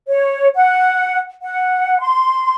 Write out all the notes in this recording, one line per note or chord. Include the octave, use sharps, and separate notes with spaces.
C#5
F#5
F#5
C6